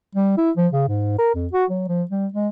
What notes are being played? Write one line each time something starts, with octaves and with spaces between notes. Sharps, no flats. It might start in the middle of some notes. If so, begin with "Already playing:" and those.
G3
E4
F3
C#3
G#2
A#4
F2
F#4
F#3
F3
G3
G#3